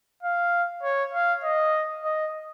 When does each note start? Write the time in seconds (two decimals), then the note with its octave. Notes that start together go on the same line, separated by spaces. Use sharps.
0.23 F5
0.83 C#5
1.14 F5
1.43 D#5
2.04 D#5